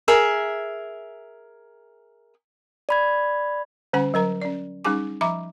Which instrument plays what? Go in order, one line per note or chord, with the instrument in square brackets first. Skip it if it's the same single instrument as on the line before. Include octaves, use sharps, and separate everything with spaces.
[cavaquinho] G#4 A#4 E5
[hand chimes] D5 B5 G#6
[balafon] D3 G3 C#4 F#5 G#5
F#3 A#4 A#5
C#4 D5
G3 C#4 D#4 G#4 G#5 D6
F3 E5 A#5 B5 D6